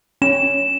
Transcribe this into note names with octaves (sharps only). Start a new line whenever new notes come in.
C#4 E7